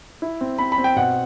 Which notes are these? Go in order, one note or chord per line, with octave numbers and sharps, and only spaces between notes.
E4
C4
C4 B5
B5
C4
G5
B2 F#5